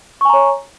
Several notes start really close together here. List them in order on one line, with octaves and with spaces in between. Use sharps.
C#6 G#5 A#5 C#5